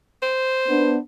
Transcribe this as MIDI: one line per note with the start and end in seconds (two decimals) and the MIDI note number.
0.22 0.96 72
0.68 0.98 59
0.68 0.98 62